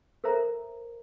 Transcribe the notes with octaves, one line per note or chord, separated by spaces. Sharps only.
A4 A#4 C5 E5 A#5